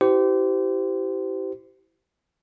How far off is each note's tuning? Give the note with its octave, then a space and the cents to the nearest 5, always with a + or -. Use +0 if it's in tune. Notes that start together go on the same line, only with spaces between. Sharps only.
E4 +0 G4 -25 C5 -30